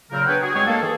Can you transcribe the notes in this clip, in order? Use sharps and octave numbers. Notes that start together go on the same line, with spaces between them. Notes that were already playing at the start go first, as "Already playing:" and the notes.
A#2 C#3 F#3 C4 A#4
B3 D4 B4 C#5 F#5 G5
F#4 G#4
G2 G#3 C4 G#4 C#5
A#3 A4
D#3 E3 G#4 A4